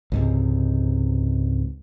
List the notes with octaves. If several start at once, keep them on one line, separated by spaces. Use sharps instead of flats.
C#2 G#2 C3